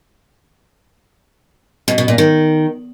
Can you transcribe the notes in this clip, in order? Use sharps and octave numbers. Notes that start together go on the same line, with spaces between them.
B2
B2
A#2
D#3